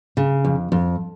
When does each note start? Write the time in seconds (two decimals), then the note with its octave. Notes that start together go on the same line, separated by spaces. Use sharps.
0.17 C#3
0.45 F2
0.72 F2